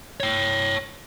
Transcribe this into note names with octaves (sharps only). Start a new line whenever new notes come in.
C#5 G5